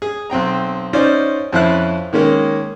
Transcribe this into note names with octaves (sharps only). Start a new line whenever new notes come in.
G#4
B1 C4 G5 A#5
C#4 D#4 F4 C5 D5
F2 F3 C#4 E4 F5 F#6
D#3 G#3 A#3 C#4